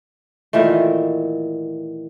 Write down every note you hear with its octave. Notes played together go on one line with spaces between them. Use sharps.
A#2 D#3 E3 A3